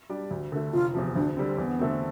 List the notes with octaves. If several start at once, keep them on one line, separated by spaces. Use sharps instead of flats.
G3 D4 G4 D5
D2
D3 A3
F1 F4
E2 C3 F3
D2 D4
D3 G3 C4
E2 B3
D3 A3 C4